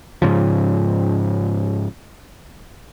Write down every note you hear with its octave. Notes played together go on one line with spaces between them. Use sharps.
G#2 C#3 F3